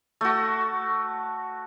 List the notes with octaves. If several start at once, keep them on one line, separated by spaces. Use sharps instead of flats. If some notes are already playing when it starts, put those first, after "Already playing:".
A3 F#4